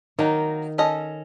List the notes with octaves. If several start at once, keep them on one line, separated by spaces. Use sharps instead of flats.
D#3 F#3 A#3 D#4
C#4 A4 D#5